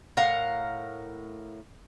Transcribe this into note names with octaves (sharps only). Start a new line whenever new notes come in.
A2 A#4 F5 F#5